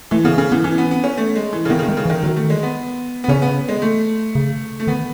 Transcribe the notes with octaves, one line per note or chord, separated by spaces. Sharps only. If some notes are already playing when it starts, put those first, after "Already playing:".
E3 A3
C#3 B3
C#3 C#4
E3 B3
E3 C#4
B3
B3
C#4
A3
G#3
E3
C#3
D#3 B3
C#3
D#3 G#3
C#3
E3
D#3
D#3 F#3
A3
G#3
B3
B3
C#3 C#4
B3
G#3
A3
C#3
A3
D#3 B3